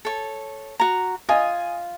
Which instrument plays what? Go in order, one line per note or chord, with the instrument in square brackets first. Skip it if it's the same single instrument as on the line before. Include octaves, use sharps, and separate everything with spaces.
[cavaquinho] A4 C#5
F#4 A#5
[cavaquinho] F4 [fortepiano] D#5 G#5